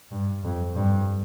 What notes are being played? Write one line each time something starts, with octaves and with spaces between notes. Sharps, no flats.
G2
F2
G2